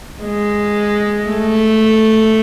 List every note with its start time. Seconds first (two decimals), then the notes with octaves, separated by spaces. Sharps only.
0.23 G#3
1.28 A3